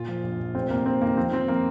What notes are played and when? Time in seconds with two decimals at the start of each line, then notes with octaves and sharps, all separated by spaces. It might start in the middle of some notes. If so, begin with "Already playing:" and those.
Already playing: A#2 F4
0.08 F3
0.23 A#1
0.40 A#1
0.55 F1 C4
0.70 F1 A#3
0.86 F1 C4
1.01 D#3 A#3
1.17 F3 C4
1.32 F3 C4
1.48 F3 A#3